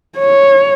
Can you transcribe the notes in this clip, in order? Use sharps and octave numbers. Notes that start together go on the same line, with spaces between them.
C#5